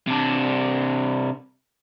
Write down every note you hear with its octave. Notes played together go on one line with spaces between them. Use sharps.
C3 D4